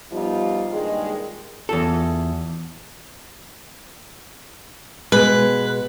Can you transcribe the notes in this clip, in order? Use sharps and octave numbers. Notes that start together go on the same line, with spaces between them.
F3 G3 B3 D#4 F4
G2 A#2 D#3 G#3
E2 F4 A4
B2 G#3 B4